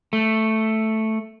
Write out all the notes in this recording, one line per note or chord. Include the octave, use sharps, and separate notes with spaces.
A3